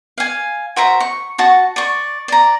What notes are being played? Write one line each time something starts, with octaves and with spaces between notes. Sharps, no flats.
F5 G#5
F#4 C5 E5 A#5
C#6
F#4 A5 C#6
D5 C#6
D5 A#5